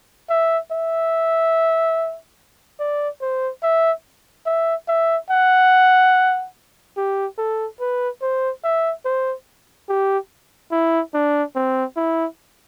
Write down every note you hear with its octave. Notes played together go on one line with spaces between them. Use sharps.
E5
E5
D5
C5
E5
E5
E5
F#5
G4
A4
B4
C5
E5
C5
G4
E4
D4
C4
E4